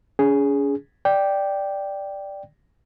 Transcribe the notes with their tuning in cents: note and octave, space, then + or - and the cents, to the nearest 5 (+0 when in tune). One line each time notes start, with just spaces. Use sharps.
C#4 +40 G#4 +0
D5 +0 G5 +0